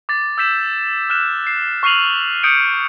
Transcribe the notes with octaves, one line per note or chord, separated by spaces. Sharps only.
D6 A6
E6 G6 B6 E7
F6 F#6 E7
C7
C#6 F6 C7 D#7 F7 F#7
D#6 G6 C#7 D7